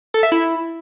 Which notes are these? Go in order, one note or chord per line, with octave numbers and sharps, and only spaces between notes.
A4
E5
E4